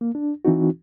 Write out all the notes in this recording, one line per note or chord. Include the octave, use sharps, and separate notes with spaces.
A#3
D4
E3 C4 D#4 F#4